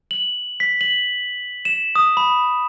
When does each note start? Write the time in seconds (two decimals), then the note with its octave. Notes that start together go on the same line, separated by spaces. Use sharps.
0.11 F#7
0.60 B6
0.81 F#7
1.65 E7
1.95 D#6
2.17 B5